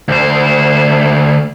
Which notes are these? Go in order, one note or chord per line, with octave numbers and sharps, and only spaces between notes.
D2 C5